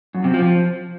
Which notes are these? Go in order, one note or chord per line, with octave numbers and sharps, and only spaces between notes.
F#2
C3
F3